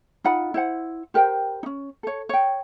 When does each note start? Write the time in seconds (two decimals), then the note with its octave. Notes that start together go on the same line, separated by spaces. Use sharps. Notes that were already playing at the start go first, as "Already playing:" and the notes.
0.24 D#4 F4 F#5 B5
0.54 E4 C5 F#5
1.14 G4 A#4 C5 G5
1.63 C#4 D#4
2.03 A4 C#5
2.29 C#5 G5